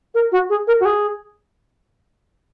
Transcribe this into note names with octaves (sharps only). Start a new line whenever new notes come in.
A#4
F#4
G#4
A#4
F#4
G#4